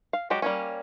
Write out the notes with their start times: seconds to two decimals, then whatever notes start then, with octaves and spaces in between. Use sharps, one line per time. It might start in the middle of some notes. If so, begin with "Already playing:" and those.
0.13 F5
0.30 F#3 G#3 F#4 G4
0.42 G3 A#3 C#4